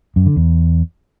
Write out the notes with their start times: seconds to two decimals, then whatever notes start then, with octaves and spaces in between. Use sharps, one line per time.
0.16 F#2
0.26 D3
0.36 E2